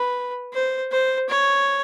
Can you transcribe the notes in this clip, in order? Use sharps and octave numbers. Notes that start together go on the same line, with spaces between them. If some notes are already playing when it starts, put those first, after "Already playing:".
Already playing: B4
C5
C5
C#5